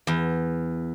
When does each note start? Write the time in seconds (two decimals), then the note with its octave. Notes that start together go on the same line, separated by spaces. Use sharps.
0.07 E2